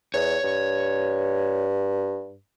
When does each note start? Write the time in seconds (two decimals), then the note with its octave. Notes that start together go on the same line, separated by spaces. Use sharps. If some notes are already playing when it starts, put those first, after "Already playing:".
0.14 E2 C#5
0.43 G2